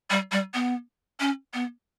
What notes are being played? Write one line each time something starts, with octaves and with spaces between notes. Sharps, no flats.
G3
G3
B3
C#4
B3